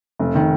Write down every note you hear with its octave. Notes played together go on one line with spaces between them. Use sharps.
F1
D#3